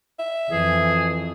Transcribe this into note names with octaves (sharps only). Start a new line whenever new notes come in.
E5
F2 E3 G#4